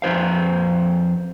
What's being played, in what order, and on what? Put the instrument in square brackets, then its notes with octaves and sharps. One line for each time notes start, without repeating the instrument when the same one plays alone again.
[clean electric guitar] F2 B4 C5 F5